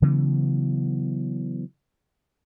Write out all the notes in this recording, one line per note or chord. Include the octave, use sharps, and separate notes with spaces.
C#3 E3 F#3 B3